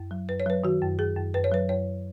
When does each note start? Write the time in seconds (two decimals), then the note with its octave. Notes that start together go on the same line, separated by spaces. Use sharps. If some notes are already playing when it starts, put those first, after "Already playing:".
Already playing: F#2
0.11 F#3
0.29 F#2 B4
0.40 C#5
0.46 F#3 B4
0.64 D#3 F#4
0.82 F#2
0.99 F#2 G#4
1.16 F#2
1.34 F#2 B4
1.44 C#5
1.52 F#3 B4
1.69 F#2 C#5